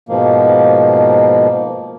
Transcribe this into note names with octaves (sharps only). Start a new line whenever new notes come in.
G#2 B2 F3 A#3